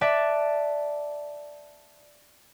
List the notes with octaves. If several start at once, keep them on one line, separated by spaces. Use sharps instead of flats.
D5 E5 A5 F#6